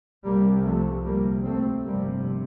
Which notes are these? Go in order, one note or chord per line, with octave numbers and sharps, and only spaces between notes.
C2 C3 G3 A#3
F3 A3
D2 C3 G3 A#3
A3 C4
G1 F2 C3 G3 A#3